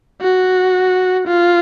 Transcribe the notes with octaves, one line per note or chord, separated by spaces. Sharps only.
F#4
F4